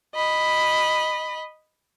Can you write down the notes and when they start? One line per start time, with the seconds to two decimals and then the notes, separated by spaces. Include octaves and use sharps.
0.15 D#5 B5